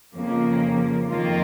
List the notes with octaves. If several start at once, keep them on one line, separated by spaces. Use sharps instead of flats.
F2 C#3 F3 A#3
F2 D#3 A#3 F4